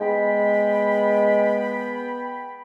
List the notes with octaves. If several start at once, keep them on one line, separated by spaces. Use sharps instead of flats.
G#3 B3 G5 B5